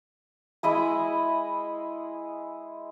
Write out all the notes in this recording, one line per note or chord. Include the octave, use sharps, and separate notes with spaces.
G#3 E4 D#5 B5